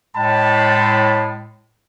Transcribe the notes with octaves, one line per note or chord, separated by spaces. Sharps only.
A2 G#3 G5 A5 B5